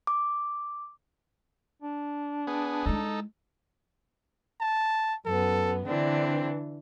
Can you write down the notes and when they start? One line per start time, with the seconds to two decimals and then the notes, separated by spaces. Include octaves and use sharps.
0.07 D6
1.82 D4
2.47 B3 G#4
2.86 G#3 D#4 E4 A4
4.61 A5
5.25 F#2 B3 A4
5.86 D3 E3 C4 D4